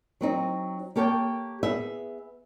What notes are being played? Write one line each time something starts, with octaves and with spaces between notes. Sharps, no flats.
F#3 C4 D#4
A#3 G4 A4 C#5 G5
B3 G#4 E5